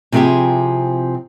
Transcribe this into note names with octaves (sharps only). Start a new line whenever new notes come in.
C3 F3 C4 E4 G4 G#4